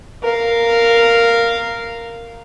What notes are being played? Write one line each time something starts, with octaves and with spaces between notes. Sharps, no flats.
A#4 F5